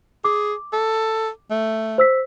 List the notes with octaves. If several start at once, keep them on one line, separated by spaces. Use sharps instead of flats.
G#4 D6
A4
A3
C5 E6 B6